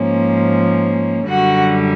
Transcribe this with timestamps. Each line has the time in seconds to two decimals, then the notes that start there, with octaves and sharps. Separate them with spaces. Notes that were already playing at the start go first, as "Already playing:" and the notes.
Already playing: G#2 F3 A#3 C#4
1.28 F#2 D3 G3 F#4 F#5